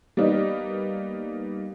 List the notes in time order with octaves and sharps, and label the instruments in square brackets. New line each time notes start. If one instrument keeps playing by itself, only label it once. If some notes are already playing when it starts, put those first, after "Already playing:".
[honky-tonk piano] G3 A#3 B3 D#4 D#5